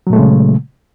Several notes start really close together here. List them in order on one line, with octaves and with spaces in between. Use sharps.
F#3 A#2 A3 G#3 C#3